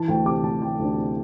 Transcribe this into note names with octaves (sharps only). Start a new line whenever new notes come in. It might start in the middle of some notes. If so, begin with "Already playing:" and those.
Already playing: E3 A5
D2 G5
C3 D6
D2 A5
E3 G5
D2
D4
C3 E4